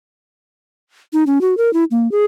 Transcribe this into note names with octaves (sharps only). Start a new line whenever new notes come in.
D#4
C#4
F#4
A#4
E4
A#3
G#4